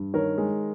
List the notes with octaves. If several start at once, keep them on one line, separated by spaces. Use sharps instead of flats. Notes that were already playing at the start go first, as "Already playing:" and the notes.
Already playing: G2
D#3 A#4 C#5
G#3